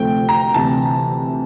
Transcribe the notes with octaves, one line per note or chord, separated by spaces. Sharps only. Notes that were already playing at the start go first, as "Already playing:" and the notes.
Already playing: D2 C3 F3 A3 C4 G5
A#5
D2 C3 E3 A5